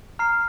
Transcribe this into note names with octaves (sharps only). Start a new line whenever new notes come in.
A#5 F6 C7